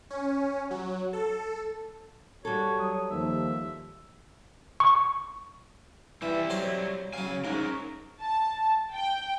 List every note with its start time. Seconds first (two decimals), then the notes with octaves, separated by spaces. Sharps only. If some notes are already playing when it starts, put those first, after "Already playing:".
0.10 C#4
0.71 F#3
1.13 A4
2.45 G3 F#4 A4 C#5
2.79 F#3 D#6
3.11 D#2 F3 E5
4.80 C#6
6.22 E3 G3 E5
6.50 F#3 C5 A#5
7.13 C#3 F#3 F5 G#5
7.45 G#2 C#4 A#4
8.21 A5
8.92 G5